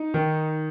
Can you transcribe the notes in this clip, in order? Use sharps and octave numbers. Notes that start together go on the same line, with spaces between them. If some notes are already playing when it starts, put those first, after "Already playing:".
Already playing: D#4
D#3